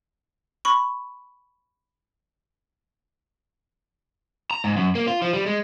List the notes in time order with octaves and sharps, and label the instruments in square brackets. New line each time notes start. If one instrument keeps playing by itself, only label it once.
[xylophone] B5 C#6
[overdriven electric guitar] A#5
G#2
F#2
A#3
F4
F3
G3
G#3